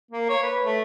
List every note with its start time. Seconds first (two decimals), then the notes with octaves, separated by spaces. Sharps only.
0.11 A#3
0.29 C#5
0.43 B4
0.64 A3